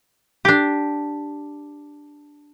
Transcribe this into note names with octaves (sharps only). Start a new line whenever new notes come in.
D4 G4